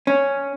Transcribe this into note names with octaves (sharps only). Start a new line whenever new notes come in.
C#4